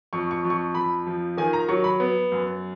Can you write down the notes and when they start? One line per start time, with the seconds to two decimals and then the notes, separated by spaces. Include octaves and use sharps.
0.13 F2 C#6
0.31 C#6
0.45 F2
0.50 C#6
0.75 F2 B5
1.07 F3
1.37 D#3 G#5
1.53 A#5
1.69 F#3 C#6
1.84 B5
2.00 B3
2.32 F#2